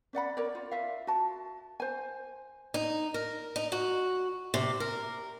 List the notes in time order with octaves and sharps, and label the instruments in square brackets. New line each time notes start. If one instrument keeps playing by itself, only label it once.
[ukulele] C#4 D5 F#5 B5
A#4 C#5 D5
F4
F4 E5 F5
F#4 A5
C5 G#5
[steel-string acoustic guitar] D#4
A#4
D#4
F#4
C3
A#4